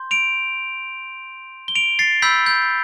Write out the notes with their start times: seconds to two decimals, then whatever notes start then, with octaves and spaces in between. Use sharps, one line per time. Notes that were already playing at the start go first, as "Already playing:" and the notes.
Already playing: C6 G6
0.11 D7 F7
1.68 G7
1.75 D7 F7
1.99 A6 C7
2.22 B5 E6 G6 B6
2.46 G6